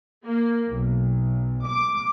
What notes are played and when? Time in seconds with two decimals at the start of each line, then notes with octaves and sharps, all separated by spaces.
0.25 A#3
0.68 B1
1.65 D6